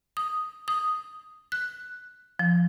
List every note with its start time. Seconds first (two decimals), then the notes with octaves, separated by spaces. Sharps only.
0.17 D#6
0.68 D#6
1.52 F#6
2.39 F3